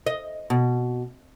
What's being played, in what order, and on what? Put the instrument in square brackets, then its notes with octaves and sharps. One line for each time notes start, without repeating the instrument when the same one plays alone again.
[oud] D#5
B2